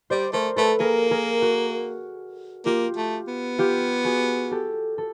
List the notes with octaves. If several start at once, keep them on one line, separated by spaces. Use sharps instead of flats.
G3 C5 D5
A3 A#4 C5
A3 A4 B4
A#3 G#4 A#4
G#4 A#4
F#4
A#3 F4 G4
A3
B3
F4 G4
F#4 G#4
G4 A4
A4